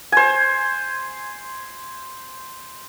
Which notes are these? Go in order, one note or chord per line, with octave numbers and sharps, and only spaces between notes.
C5 G#5